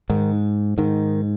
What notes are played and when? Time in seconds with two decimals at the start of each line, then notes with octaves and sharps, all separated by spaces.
0.10 G#2 D#3
0.78 G#2 D#3